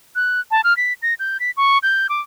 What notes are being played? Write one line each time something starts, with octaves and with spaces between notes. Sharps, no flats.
F#6
A5
F6
B6
A#6
G6
B6
C#6
G6
D6